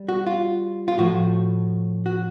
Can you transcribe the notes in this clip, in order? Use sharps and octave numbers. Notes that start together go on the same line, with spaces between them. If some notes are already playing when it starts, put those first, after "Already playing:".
Already playing: G3
F#4
F4
F4
A2 F3 A3 F#4
F#4